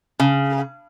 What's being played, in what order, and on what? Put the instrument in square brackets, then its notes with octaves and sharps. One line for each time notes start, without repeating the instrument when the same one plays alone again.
[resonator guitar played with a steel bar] C#3